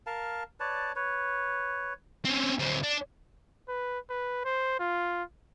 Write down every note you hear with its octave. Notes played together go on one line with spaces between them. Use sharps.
A#4 F5 A5
B4 C#5 D5 A5
B4 C#5
C4 C#4
D2 C4
D4
B4
B4
C5
F4